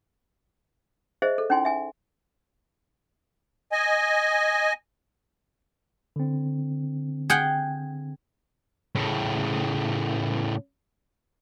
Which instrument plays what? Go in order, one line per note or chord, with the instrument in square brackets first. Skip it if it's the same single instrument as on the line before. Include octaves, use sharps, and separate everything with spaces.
[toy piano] G#4 C5 D#5 E5
A4
C#4 D#4 E4 G5 G#5 C6
E5 G#5
[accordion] D#5 G#5
[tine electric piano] D3 C4
[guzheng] G#4 F#5 G5
[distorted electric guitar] A2 C#3